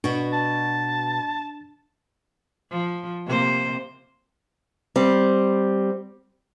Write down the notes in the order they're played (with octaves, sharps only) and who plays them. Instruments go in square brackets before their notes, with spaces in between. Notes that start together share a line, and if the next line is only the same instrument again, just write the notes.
[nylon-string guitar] B2 F#4 [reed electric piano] D4
[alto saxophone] A5
[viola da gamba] F3
C3 A#3 C5
[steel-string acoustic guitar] G3 C4